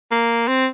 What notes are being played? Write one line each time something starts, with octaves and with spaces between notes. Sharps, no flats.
A#3
C4